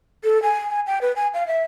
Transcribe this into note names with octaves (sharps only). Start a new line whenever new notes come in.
A4
G#5
G#5
G5
B4
G#5
F5
E5